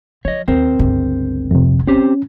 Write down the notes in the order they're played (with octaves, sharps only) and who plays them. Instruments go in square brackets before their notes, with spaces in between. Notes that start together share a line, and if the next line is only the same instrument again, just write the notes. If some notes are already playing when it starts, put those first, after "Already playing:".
[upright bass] F3 [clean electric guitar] C#5 D#5
[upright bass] D#2 [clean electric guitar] C4 A#4 C5
[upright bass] G1 C#2
[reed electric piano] F2 C3
[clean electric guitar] C4 G4 C5 [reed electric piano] C#4